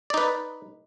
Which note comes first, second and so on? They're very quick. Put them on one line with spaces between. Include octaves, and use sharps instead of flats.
D5 D#4 B4